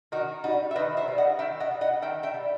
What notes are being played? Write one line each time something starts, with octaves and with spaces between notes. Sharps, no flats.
D#3 D#4 F#4
G3 D#4 F#4
E5
D#3 B4 D#5
C5 E5
G3
D#5 F#5
D#3 E5 G5
D#5 F#5
G3
D#5 F#5
D#3 E5 G5
E5 G5
G3